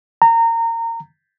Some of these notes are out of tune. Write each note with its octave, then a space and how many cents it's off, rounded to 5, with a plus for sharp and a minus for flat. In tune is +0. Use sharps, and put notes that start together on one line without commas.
A#5 -25